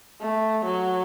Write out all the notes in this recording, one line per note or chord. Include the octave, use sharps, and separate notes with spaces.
A3
F#3